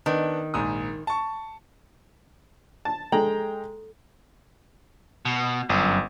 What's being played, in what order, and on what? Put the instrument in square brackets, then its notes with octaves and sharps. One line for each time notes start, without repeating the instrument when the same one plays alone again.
[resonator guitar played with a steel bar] D#3 [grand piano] B3 D4
[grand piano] A#1 G#2 D#6
A5 C#6
[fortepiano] A5
[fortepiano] G#3 G5 A#5 [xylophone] A4
[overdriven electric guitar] B2
[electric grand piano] G1 [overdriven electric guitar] F#2